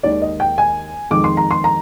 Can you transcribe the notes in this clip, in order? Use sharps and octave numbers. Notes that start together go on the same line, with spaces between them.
D#2 D#3 G#3 D5
D#5
G5
G#5
F2 D#3 G#3 D6
C6
A#5
C6
A#5